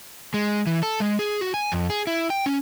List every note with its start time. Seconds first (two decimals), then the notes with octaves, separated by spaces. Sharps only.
0.34 G#3
0.67 E3
0.83 A4
1.00 G#3
1.19 G#4
1.41 F#4
1.54 G#5
1.72 F2
1.90 G#4
2.07 E4
2.30 G5
2.46 C#4